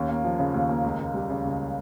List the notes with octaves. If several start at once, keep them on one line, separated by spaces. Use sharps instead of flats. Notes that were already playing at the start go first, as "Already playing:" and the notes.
Already playing: D#2 C#4
A#3
F3
C#3
D#2
A#3
C#2
C#2
G3
C#3
C#2